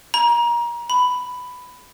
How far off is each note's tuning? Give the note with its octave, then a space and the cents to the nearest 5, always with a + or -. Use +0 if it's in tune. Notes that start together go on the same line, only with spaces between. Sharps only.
A#5 +30
B5 +10